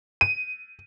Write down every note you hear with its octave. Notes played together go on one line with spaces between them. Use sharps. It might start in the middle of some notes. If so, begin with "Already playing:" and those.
D#7